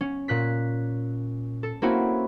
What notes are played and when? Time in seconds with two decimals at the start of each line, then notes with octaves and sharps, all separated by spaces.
0.01 C#4
0.28 A#2 F#6 B6
1.63 A4
1.82 A#3 C4 C#4 E4 F#4